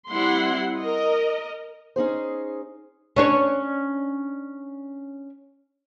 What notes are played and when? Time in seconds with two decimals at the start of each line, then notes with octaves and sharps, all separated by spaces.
0.11 G3 C4 E4 F#5 C6
0.81 A#4 D#5
1.96 C#4 D#4 G#4 C5
3.16 C#4 D4 C#5